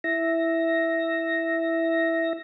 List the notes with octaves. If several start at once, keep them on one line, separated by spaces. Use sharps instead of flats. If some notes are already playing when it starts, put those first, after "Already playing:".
E4 E5 A#6